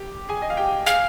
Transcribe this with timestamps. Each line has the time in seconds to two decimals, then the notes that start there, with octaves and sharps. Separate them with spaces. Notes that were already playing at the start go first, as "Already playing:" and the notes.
Already playing: G4
0.29 G#4 G#5
0.42 D#5
0.50 F5
0.57 G4 G5
0.86 G#4 F5 G#5